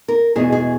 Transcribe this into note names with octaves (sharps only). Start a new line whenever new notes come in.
A#4
E2 B2 G#3 G#4
G#4